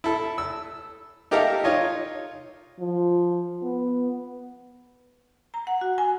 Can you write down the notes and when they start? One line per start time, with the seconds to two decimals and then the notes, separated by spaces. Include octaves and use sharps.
0.04 E4 A4
0.38 E6
1.31 D#4 G4 A4 A#4 E5 F5
1.64 D#4 F4 C#5 D#5
2.80 F3
3.63 B3
5.54 A#5
5.67 F#5
5.81 F#4
5.98 G#5